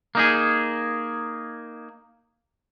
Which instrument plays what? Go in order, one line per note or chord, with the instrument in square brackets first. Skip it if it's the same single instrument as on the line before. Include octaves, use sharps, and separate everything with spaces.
[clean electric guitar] A#3 D#4 G#4